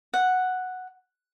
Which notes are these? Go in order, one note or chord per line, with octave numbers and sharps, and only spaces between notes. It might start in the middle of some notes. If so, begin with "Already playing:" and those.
F#5